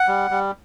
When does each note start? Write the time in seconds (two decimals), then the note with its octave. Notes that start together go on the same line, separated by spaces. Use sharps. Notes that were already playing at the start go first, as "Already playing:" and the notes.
Already playing: F#5
0.08 G3
0.31 G3